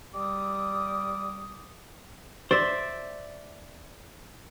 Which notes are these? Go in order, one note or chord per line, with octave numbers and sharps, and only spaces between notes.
G3 D6 D#6
C5 D5 E5